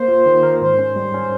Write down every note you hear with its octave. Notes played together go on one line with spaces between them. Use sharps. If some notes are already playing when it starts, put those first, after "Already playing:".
Already playing: A#3 C5
F4
D#3
A#4
G#2 C5
C#4
G3
C#4